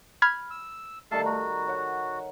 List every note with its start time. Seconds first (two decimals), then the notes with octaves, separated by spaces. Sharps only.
0.22 B5 F6 G#6
0.51 E6
1.11 D#3 G3 A3 A4 F5 A5
1.26 F#4 A#5
1.68 C#5 F#5